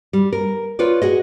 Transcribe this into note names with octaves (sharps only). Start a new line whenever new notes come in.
G3
A#4
F4 B4 C#5 D5
F#4 G#4 D#5